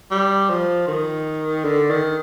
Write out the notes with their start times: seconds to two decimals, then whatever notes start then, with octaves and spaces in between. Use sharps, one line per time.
0.11 G3
0.50 F3
0.88 D#3
1.65 D3
1.90 D#3